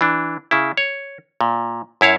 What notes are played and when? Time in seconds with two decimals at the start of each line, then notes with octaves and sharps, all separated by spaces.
0.01 E3 D4
0.51 C#3 E4
0.77 C#5
1.41 A#2
2.01 F#2 E4 C#5 F5